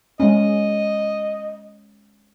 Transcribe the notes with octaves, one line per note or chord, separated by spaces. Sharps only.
G#3 C#4 D#5